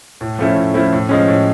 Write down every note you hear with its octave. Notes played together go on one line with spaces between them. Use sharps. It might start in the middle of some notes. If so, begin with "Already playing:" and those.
A2
F3 A3 C#4 E4
A2
F3 A3 C#4 E4
A2
F3 G#3 C#4
A2